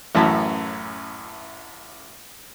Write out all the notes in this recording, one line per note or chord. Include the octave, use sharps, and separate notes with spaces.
A1 F#2 A2 E3 E5 A5